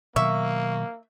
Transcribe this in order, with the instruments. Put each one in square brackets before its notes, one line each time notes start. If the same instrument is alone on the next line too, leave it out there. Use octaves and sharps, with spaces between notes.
[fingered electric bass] B2 D#3 F#3 [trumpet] A#3 [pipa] E5 [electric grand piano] C#6